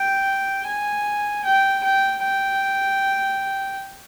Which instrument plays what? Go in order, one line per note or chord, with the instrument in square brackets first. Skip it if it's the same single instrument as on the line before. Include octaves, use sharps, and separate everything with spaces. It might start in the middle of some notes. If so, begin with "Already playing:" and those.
Already playing: [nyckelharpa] G5
G#5
G5
G5
G5